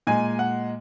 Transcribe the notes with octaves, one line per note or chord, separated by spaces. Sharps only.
A#2 G#3 G#5
F#5